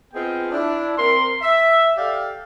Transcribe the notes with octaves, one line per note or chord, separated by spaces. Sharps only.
B3 C4 F4 G#4 D#5 G5
D4 E4
C4 A#4 C6
E5
G4 A4 D5 F5